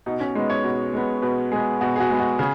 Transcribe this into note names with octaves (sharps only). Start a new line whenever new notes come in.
B2 D#4
C#4
G#3 B3 D#4
C#5
B2
G#3 B3
B2 B4
G#3 B3 G#4
B2 F#4
G#4
F#4
G#3 B3
F#4
C#3 G#4